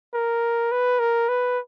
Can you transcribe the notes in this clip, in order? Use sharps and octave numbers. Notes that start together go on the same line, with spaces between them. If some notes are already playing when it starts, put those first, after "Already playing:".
A#4
B4
A#4
B4